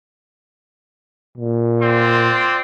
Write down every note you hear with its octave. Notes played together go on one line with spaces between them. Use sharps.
A#2
C4 F4 D5